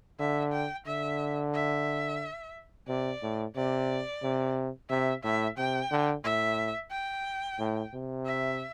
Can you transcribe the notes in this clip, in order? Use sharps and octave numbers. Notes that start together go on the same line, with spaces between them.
D3 E5
G5
D3 E5
E5
C3 D5
A2
C3 D5
C3
C3 E5
A2 E5
C3 G5
D3
A2 E5
G5
A2
C3
E5